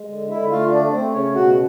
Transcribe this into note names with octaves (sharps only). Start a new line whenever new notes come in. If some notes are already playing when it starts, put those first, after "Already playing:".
Already playing: G#3
D3
D3 E4 E5
A3 F4 F5
A3 D4 D5
A3 C4 C5
C#3 C#4 C#5
B2 F#4 F#5